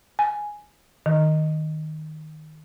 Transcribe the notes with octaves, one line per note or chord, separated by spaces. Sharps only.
G#5
D#3